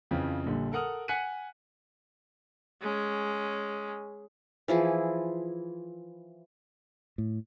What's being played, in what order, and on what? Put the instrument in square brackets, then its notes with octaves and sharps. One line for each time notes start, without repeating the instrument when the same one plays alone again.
[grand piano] F2 C#3 E3 F3
A#1 A#2 D3 G3
A4 A#4 F#5 D#6 F6
F#5 G#5 F#6 B6 C#7 D#7
[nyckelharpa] G#3 C#4
[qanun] E3 F3 E4 G#4
[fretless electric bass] A2